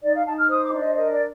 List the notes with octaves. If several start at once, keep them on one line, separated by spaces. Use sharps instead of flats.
D#4 D5
F5
D#4 A5
F6
C5 D#6
D6
D4
D#5
A#4 D#5
D5